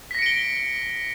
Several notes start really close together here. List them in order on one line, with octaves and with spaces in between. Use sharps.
B6 A#6 C#7 D7 G7